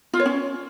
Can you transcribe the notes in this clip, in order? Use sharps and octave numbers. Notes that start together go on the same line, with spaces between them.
F4
C#5
C#4